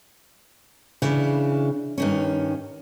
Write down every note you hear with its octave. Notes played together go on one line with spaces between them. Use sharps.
C#3 E3 D4
G2 D#3 C#4